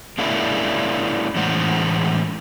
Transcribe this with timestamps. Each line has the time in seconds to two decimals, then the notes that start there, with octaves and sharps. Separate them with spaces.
0.18 G#3 A#3 C#4 D4 E4
1.35 A2 E3 G#3 C#4 C5 F#5